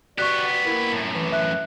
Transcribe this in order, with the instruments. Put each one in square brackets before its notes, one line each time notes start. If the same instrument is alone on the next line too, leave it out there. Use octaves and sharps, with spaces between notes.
[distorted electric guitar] B3 G4 [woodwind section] F#4 D5 [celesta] C#6 F#6
[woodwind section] A#3 E4
[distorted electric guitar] F#2 A2
[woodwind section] E3
[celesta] E5 F#6